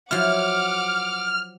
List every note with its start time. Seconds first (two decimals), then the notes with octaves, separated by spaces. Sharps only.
0.11 F3 F#3 E4 F#5 D6 F6